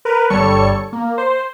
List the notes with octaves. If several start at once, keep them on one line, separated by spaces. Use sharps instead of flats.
A#4 B4
G1 G3 A4 C#5 C#6 C#7
A#3
C5